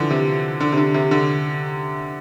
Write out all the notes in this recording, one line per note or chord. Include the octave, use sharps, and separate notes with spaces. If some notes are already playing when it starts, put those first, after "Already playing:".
Already playing: D3 E3 F3
C3
D3
C3
D3
C3
D3